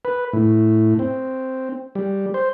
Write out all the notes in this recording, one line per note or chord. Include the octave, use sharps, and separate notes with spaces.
B4
A2
C4
G3
C5